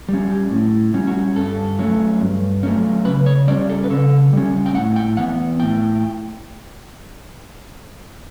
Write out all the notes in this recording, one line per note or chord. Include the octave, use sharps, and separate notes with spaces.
G3 C#4
G4
A2
G3 C#4
F#4
G2 A4
F#3 A3 C#4
G2
F#3 A3 C#4
C#3 B4
C#5
G3 C#4 D5
A4
B4
C#3 A4
G3 C#4
G5
A2 F#5
G5
E3 B3 F#5
A2 G5